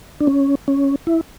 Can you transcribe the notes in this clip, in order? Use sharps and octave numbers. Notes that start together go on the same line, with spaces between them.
D4
C#4
C#4
E4